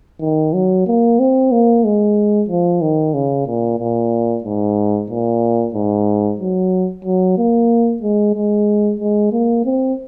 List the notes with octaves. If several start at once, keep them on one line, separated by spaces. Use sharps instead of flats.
D#3
F#3
A#3
C4
A#3
G#3
F3
D#3
C#3
A#2
A#2
G#2
A#2
G#2
F#3
F#3
A#3
G#3
G#3
G#3
A#3
C4